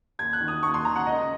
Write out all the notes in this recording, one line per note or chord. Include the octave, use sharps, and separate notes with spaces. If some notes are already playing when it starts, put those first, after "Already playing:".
D#2 G#6
F#6
D#3
D#6
D#2 C#6
C6
D#3 A#5
F#5
C#2 D#5